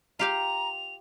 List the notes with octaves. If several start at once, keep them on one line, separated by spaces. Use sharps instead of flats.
F4 G4 F5 A#5 F7